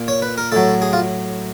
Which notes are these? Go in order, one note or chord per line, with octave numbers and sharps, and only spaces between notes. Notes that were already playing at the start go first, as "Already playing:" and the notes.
Already playing: A#2
C#5
B4
A#4
A2 F#3 A4
G#4
F4